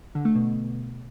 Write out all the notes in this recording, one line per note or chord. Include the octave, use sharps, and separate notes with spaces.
D3
A3
B2